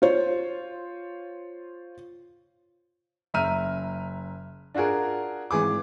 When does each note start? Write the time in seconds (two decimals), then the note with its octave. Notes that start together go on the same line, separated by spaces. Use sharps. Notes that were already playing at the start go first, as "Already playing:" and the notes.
0.02 F4 C5 C#5
3.34 F#1 E5 A#5 F6 D#7
4.74 D4 F4 F#4 G#4 A#4
5.51 G#1 E3 G#4 D6